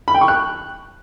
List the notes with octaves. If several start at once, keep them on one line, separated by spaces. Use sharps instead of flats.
B5
G5
C#6
F#6